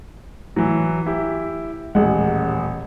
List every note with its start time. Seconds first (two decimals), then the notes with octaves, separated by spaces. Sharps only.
0.56 A2 E3 F#3
1.06 E4 G4
1.95 D#1 A1 G#3 F#5